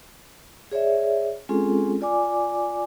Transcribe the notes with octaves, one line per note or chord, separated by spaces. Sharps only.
G#4 C#5 D5 E5
G#3 C4 C#4 F4 G#4 A4
F4 D5 G#5 D6